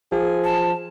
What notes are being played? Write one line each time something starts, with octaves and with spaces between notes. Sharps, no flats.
F3 G#4
A5